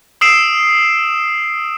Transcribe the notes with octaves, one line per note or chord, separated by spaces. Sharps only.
D#6 E6 C7 D7 E7